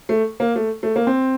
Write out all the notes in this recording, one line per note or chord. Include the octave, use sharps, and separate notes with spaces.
A3
A#3
A3
A3
A#3
C4